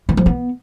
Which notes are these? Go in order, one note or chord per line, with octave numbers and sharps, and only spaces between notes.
E3
F3
B3